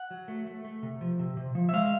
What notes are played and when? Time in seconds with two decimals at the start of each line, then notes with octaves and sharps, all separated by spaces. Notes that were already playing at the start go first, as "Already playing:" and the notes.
Already playing: F#5
0.11 F#3
0.28 A3
0.47 A3
0.65 A3
0.83 C3
1.01 F3
1.19 C3
1.37 C3
1.55 F3
1.69 E5
1.73 G#3 F5